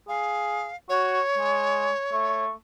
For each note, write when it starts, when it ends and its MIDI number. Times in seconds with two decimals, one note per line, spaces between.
0.08 0.68 68
0.08 0.76 77
0.89 1.20 66
0.89 2.44 73
1.38 1.90 56
2.12 2.51 57